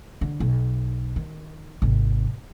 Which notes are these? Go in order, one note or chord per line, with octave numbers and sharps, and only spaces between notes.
D3
B1
D#3
G#1 C3